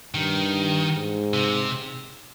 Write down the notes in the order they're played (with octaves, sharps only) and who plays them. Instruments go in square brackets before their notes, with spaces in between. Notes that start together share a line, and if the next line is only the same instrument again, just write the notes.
[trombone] G2 [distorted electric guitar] D#3
[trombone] G#2
[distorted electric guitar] C3